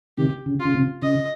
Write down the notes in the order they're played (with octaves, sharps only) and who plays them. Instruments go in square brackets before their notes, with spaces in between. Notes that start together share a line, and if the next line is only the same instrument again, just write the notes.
[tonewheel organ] C3 D#3 [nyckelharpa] G4
[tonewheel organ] C#3
[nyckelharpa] F4
[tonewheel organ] C#3
C3
[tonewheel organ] C#3 [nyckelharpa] D#5